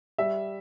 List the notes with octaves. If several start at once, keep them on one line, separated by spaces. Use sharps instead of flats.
G3 E5